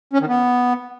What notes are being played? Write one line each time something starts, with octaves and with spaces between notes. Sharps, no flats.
C#4
D#3
B3